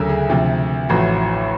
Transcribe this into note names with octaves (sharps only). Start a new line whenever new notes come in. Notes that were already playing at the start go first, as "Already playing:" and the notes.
Already playing: D2 C#3 F#3 A4 A#4
G#4
D2 C3 F3
A1 A2 F3 F#4